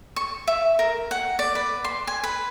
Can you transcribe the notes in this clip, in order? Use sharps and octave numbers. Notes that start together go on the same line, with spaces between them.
C#6
E5
A#4
F#5
D5
B4
C6
G#5
B4